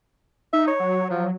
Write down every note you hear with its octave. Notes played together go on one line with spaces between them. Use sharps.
D#4 E5
C#5
F#3
F3